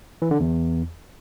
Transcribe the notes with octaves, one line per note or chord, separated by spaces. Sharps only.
E3
D3
E2